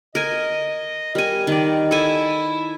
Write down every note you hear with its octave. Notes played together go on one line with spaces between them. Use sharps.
A#4 D#5 G#5
G3 A#4 G#5
D#3 D5
E4 A4 G#5